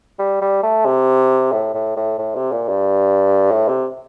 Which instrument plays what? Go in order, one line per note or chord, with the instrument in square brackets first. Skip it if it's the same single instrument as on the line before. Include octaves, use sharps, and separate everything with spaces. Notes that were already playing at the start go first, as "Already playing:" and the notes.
[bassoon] G3
G3
A3
C3
A2
A2
A2
A2
C3
A#2
G2
A2
C3